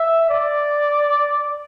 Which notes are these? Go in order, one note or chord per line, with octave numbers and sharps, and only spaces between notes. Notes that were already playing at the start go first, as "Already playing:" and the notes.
Already playing: E5
D5